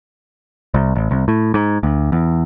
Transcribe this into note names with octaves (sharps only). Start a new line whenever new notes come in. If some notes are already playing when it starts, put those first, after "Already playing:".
C2
A1
C2
A2
G#2
D2
E2